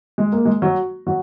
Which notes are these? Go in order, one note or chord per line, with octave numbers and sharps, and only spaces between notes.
G#3
A#3
G#3
F#3 F#4
F#3 F#4